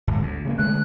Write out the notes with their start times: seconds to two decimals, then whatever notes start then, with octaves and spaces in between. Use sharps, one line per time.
0.07 D1 G1 G#2
0.22 D2
0.45 C#3 F#3 A#3
0.58 D3 G#3 A3 F#6